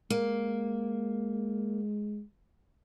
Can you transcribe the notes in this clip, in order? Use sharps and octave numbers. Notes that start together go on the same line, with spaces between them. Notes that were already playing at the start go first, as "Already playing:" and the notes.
G#3 A#3